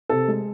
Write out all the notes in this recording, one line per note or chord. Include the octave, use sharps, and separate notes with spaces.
C3 A4
G#3